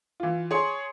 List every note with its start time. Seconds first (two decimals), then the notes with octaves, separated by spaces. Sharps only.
0.20 E3 F4
0.51 G#4 C#5 C6 C#7